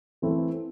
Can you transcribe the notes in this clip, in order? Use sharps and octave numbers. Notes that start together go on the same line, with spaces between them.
E3 A3 C4 E4 A4